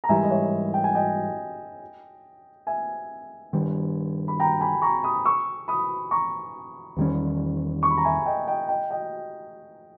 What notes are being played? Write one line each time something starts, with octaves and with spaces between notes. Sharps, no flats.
A#5
G#2 E3 G3 E5 G#5
D#5
C#5 E5
G5
G#5
D#5 G5
E5 G#5
G2 D#3 G3
B5
G5 A#5
G#5 B5
A#5 C#6
B5 D#6
C#6 E6
B5 D#6
A#5 C#6
E2 D#3 G3 C#4
C#6
B5
A#5
E5 G#5
D#5 G5
D#5 G5
D#5 G5
D#5 G5